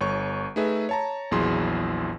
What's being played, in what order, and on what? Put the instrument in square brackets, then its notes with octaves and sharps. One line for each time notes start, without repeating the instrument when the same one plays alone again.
[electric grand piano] G1 C#5 C#6
A3 D#4 G#4 B4 E5
C#5 A5 A#5
A#1 E2 F#3 E4 G#4 C6